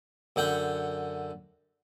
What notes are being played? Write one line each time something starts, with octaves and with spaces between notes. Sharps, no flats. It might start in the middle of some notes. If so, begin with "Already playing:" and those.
F#2 D3 F#5 G5